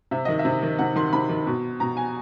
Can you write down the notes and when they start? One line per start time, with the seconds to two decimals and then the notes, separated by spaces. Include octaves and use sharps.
0.11 C3 E5
0.25 D#3 D#5
0.39 E5
0.45 C3
0.63 D#3
0.79 C3 F#5
0.96 D#3 C6
1.13 C3 B5
1.29 D#3
1.47 B2
1.80 B2 A#5
1.97 G#5